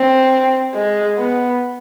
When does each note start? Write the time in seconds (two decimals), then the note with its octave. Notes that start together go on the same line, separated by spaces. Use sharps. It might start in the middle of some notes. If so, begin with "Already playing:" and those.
Already playing: C4
0.74 G#3
1.18 B3